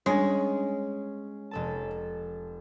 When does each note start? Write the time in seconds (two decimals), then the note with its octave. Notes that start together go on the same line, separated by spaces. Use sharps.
0.06 G3 G#3 C#4 D4
1.51 F1 A4 A5